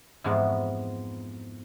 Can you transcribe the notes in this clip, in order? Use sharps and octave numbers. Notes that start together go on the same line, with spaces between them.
F2 G#2 E3 F3 G#3 B3